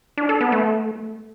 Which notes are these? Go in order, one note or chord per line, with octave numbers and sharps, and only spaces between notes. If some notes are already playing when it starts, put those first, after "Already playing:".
D4
A4
B3
A3